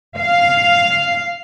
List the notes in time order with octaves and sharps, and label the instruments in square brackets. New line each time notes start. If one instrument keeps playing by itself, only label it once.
[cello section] F5